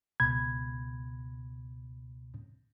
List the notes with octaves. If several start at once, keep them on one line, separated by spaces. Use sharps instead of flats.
C#2 B2 B5 G#6